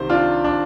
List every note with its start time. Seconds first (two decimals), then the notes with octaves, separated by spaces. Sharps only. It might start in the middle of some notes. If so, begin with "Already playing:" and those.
Already playing: C2 C3 D#3 C5
0.10 D4 F4
0.44 D4